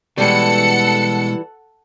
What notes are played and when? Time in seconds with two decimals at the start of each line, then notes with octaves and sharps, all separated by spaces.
0.17 B2 E3 G3 G#3 A4 F#5 C#7